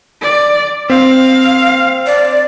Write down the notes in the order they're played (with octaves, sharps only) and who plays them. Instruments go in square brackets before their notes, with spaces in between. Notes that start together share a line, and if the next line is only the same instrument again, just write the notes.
[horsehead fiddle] D5
[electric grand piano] C4 [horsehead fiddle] F5
[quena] D5